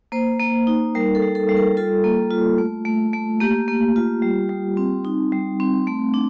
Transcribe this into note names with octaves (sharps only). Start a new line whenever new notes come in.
A#3 C5
A#3
D#4
G3 A#4
A4
G3
A4
G3
A#4
F4 A4
A#3
F4
A3
A3
A3
A#3 G4
A#3
F4
G3
G3
C4
D#4
G3
C4
A3
D4